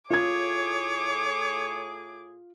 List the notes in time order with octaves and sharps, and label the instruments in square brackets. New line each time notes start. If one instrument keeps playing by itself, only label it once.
[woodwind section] A2 G#4 [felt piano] F4 G#6 [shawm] C#5 [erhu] D6